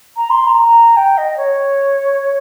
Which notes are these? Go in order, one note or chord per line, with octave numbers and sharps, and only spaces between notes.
A#5
C6
C6
A#5
G5
D#5
C#5